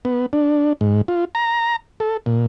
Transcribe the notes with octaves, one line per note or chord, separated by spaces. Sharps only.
B3
D4
G#2
F4
A#5
A4
A#2